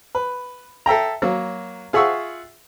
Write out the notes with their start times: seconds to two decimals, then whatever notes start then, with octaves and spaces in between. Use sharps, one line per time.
0.15 B4
0.86 A4 E5 G5 A#5
1.22 F#3 A#3
1.93 F4 G#4 E5 F#5 C#6 E6